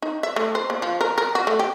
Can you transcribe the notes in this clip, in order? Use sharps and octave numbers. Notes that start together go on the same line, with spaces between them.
D#4
E5
A3
C5
A#3
F3
A#4
A#4
F#4
A3
G4